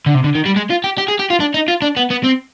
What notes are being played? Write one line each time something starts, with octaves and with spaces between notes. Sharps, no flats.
D3
C3
D3
D#3
G3
G#3
F4
G4
G4
G#4
G4
F4
D4
D#4
F4
D4
B3
B3
C4